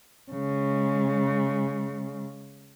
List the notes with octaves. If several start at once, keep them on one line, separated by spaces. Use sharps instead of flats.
C#3 G#3